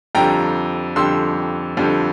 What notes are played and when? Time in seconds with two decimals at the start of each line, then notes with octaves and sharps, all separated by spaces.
0.15 F2 D3 G3 G5 A#5
0.96 F2 D3 G3 C6 E6
1.77 F2 D3 G3